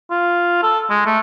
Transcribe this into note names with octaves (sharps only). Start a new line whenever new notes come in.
F4
A4
G#3
A3